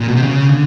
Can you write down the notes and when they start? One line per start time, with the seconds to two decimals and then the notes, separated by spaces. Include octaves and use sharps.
0.01 A#2
0.08 B2
0.15 C3
0.22 C#3
0.49 D3